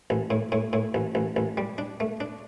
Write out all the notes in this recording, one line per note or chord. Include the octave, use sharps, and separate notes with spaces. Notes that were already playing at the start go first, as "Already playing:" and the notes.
A1
A2
A2
A2
A1
A1
A1
G3
D4
A3
D4